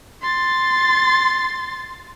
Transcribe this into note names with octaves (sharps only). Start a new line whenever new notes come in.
C6 A6